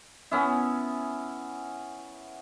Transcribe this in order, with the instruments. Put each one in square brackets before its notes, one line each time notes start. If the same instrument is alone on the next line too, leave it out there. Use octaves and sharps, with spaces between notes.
[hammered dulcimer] B3 C#4 E4